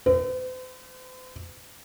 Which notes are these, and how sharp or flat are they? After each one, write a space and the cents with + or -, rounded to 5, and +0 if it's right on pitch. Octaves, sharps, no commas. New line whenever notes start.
C5 -45